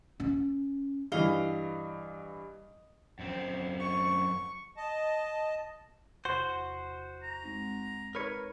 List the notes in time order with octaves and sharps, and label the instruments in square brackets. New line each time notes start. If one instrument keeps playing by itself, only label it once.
[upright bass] C#4
[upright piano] G2 E3 [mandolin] D#5 F5
[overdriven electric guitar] F#2 C4
[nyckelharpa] C#6
[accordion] D#5 A5
[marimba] E2 C3 [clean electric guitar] F#4 C5
[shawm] A#5
[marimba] G#3 C4 D#4
[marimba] D#4 [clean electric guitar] A#4 B4 C#5